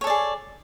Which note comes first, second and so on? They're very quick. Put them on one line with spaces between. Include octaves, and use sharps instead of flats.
C#5 A4 D5 G#4